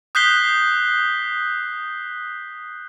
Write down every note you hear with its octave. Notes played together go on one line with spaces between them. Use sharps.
D#6 F#6 G6 B6 C7 G7